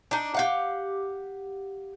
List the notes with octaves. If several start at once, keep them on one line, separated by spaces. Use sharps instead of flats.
D4 D#4
G4 F5 F#5